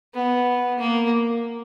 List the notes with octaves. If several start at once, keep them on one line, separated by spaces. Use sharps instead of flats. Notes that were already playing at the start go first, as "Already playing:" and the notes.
B3
A#3